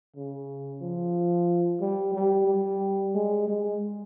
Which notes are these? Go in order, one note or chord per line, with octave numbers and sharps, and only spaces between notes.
C#3
F3
G3
G3
G3
G#3
G#3